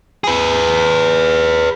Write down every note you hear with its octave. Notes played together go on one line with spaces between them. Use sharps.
G#4 B4